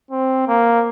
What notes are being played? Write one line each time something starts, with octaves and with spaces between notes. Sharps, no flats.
C4
A#3